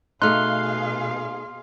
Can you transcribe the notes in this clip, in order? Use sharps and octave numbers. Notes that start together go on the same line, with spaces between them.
B2 A3 D#4 G#4 F5 C6 F6 F#6